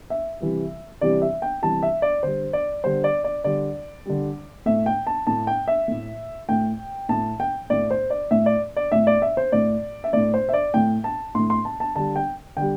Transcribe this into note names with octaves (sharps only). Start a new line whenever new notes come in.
E5
C3 E3 G3
C3 E3 G3 D5
E5
G5
C3 E3 G3 A5
E5
D5
D3 G3 C5
D5
D3 G3 C5
D5
D5
D3 G3 D5
D3 G3
A2 A3 E5
G5
A5
A2 A3 A5
G5
E5
A2 A3
A2 A3 G5
A2 A3 A5
G5
A2 A3 D5
C5
D5
A2 A3 E5
D5
D5
A2 A3 E5
D5
E5
C5
A2 A3 D5
E5
A2 A3 D5
C5
E5
D5
A2 A3 G5
A5
A2 A3 C6
C6
A5
A5
D3 G3 A5
G5
D3 G3 G5